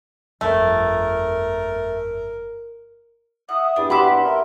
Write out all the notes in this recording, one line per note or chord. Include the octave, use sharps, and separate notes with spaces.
G1 F2 A3 A#4
E5 F#5 D#6
E2 G2 D4
G4 F#5 B5 C6 D6 E6
A#4 E5